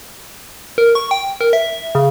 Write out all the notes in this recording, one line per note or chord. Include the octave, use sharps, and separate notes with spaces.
A#4
C#6
G5
A#4
E5
C#3